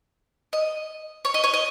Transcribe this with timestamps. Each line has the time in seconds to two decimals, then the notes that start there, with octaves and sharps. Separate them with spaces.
0.53 D#5
1.25 C#5
1.34 D#5
1.44 C#5
1.54 D#5